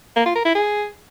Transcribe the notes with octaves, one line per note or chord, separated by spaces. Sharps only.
A#3
F4
A#4
E4
G#4